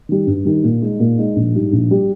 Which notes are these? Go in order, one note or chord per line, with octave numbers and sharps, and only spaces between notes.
D#3 G3
G2
D#3 G3
A#2
G#3 D#4
A#2
G#3 D#4
A#1
G#2 G3
A#1
G3